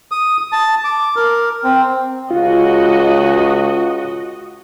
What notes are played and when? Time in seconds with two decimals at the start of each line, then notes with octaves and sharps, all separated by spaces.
0.11 D#6
0.52 A5
0.84 D6
1.16 A#4
1.64 C4
2.31 C#2 F4 F#4 D#5